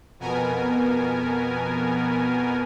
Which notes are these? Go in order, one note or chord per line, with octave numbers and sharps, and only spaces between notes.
F2 B2 B3 A#4 G#5